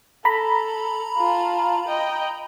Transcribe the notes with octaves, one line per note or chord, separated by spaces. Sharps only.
A4 A#5 B5
F4 A5
D#5 G5